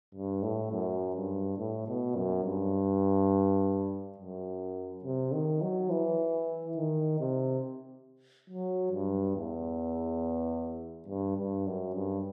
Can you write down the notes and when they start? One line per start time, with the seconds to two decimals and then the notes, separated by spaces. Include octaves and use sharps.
0.15 G2
0.43 A2
0.72 F#2
1.15 G2
1.58 A2
1.88 B2
2.16 F#2
2.45 G2
4.18 F#2
5.04 C3
5.32 D#3
5.61 F#3
5.90 E3
6.77 D#3
7.20 C3
8.50 F#3
8.92 G2
9.36 E2
11.08 G2
11.37 G2
11.66 F#2
11.94 G2